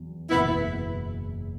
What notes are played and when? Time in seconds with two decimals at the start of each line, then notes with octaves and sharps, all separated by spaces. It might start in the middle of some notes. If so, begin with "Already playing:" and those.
Already playing: E2 F#3
0.30 F#1 E2 B2 B3 E4